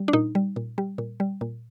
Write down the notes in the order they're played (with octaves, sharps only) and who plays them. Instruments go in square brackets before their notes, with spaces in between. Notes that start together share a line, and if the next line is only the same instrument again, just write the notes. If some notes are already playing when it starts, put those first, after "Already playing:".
Already playing: [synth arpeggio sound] G3
D4
A#2 D#4
G3
A#2
G3
A#2
G3
A#2